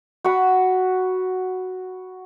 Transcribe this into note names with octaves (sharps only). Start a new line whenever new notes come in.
F#4 F#5 B5